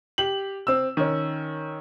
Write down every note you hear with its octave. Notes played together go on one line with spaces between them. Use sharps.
G4 F#7
C4 E6
D#3 C#4